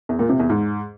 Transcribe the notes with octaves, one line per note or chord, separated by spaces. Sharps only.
E2
A#2
C3
E2
G#2